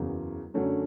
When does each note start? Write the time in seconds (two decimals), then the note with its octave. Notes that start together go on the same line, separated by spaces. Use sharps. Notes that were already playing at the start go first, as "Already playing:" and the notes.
Already playing: F#1 E2 C#3 F#3
0.54 F#2 D3 F#3 A3 C#4